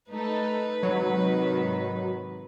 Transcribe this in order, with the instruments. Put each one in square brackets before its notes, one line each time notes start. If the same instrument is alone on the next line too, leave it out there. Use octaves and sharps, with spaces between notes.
[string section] A3 D#4 A4 [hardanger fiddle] B4
[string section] G#2 C3 D#3 [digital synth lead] F#3